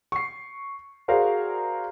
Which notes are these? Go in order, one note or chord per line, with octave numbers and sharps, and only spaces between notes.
C#6 C7
F#4 G#4 A#4 C5 D5 F5